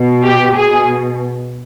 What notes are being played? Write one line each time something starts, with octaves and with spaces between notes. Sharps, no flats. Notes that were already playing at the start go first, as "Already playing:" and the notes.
Already playing: B2
G4
B2 G#4